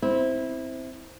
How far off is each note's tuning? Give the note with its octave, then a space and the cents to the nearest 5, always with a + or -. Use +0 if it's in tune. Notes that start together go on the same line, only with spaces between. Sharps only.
C4 +0 E4 -15